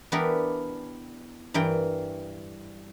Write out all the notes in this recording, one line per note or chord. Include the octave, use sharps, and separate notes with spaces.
E3 B3 D4 E4 G4 A#4
G2 E3 A#4 G5